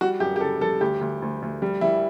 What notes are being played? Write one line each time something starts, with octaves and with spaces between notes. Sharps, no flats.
G3 F#4
F#2 G4
G4
C#3 A4
G3 A4
D2 G4
D2
D2
D2
G3
G3 E4